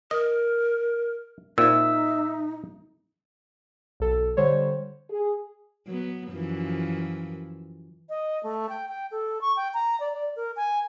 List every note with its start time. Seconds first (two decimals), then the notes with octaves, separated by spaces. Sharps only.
0.11 A#4 D#5
1.58 A#2 C4 D#4 E5 E6
4.00 B1 A4
4.37 D3 G3 C5 C#5
5.10 G#4
5.87 F#3 B3
6.31 F#2 E3 F3
8.09 D#5
8.43 A3
8.69 G5
8.89 G5
9.11 A4
9.41 C#6
9.56 G5
9.74 A#5
10.00 D5
10.14 D5
10.36 A#4
10.56 G#5